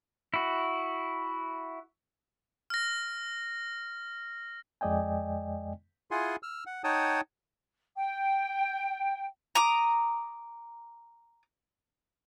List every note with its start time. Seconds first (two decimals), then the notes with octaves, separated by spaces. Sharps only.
0.34 E4 F#4
2.70 F6 A#6
4.81 F2 G#3 D5 D#5 G5 G#5
6.11 E4 F4 G#4 F#5 G#5 C6
6.43 E6 F6
6.66 F#5
6.84 D#4 C#5 F#5 G5 A5 D#6
7.96 G5
9.55 A#5 D6 D#6